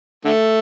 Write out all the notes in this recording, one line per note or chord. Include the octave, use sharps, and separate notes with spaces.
D3 A3